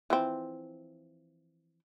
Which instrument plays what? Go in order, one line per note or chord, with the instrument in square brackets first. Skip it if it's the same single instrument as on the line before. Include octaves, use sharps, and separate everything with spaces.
[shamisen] E3 F3 C4